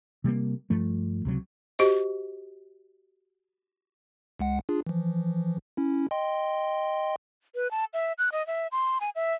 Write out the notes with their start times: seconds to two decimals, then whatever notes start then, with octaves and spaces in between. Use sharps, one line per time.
0.24 C3 G3 G#3 A#3
0.70 G2 F3 A3
1.25 C#2 C3 F#3
1.79 F#4 G4 C5 D#5
4.39 C#2 G#3 F#5
4.69 D4 F4 G#4
4.87 E3 F3
5.77 C#4 E4
6.11 D#5 G5 C6
7.55 B4
7.71 A5
7.94 E5
8.18 F#6
8.32 D#5
8.47 E5
8.72 C6
9.01 G#5
9.16 E5